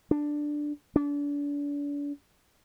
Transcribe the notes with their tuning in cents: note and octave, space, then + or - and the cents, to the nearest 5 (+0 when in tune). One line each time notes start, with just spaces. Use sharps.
D4 +5
D4 -35